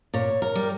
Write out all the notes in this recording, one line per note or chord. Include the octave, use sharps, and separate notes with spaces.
A#2 C#5
A#4
G3